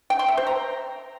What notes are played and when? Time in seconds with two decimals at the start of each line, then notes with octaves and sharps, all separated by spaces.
0.10 G5
0.19 C6
0.28 E5
0.37 C5
0.47 A#5